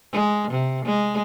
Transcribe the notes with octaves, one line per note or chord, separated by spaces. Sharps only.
G#3
C3
G#3